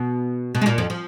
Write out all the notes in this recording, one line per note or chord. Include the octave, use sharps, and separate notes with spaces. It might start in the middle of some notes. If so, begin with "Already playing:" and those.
Already playing: B2 B3
B2 B3
G#3
A#2 A#3
F2 F3
F3